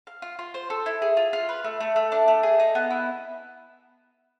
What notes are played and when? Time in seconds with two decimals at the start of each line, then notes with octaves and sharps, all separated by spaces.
0.07 F5
0.22 F4
0.39 F4
0.54 C5
0.70 A4
0.86 E4
1.02 G#4
1.17 F4
1.33 F4
1.49 B4
1.64 A3
1.80 A3
1.96 A3
2.12 D4
2.28 A3
2.43 G#4
2.60 D#4
2.75 B3
2.90 E4